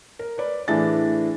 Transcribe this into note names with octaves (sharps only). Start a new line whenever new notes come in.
A#4
B4 D5
A2 E3 D4 G#4 A6